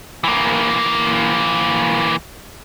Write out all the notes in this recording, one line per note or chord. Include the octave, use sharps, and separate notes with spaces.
E3 A#3